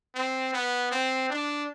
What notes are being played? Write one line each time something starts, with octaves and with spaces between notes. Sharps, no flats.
C4
B3
C4
D4